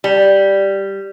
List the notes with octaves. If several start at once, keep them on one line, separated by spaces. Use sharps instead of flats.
G3